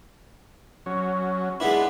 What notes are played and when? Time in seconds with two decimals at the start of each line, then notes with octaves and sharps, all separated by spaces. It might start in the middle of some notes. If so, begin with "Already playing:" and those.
0.86 F#3 C#4
1.60 G#3 B3 D4 E4 B4